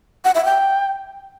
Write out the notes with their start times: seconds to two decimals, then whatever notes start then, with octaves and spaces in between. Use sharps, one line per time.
0.25 F#5
0.35 E5
0.45 G5